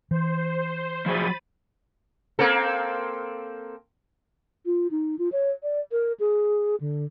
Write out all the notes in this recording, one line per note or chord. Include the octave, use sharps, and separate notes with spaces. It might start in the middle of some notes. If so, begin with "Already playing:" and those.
E3 C5
F3 F#3 G#4 B5 A6 D#7
A#3 C4 A4
F4
D#4
F4
C#5
D5
A#4
G#4
D3